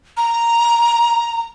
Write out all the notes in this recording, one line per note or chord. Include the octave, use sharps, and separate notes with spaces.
A#5